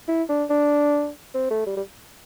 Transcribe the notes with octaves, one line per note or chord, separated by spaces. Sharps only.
E4
D4
D4
C4
A3
G3
G3